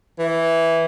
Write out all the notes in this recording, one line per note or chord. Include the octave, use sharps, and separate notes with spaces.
E3